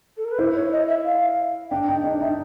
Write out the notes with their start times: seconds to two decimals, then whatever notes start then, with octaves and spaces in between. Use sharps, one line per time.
0.17 A4
0.24 A#4
0.31 B4
0.38 E4 C5
0.55 C#5
0.72 D#5
0.88 E5
1.04 F5
1.70 D4 G5
1.88 D#4 G5
2.04 D4 D#5
2.20 D#4 E5